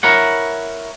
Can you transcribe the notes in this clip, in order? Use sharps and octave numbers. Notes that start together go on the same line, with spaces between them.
E4 A#4 C#5 F#5